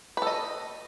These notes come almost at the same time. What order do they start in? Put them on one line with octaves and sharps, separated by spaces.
B4 A4 D#5